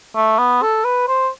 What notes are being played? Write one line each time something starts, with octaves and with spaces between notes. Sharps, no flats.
A3
B3
A4
B4
C5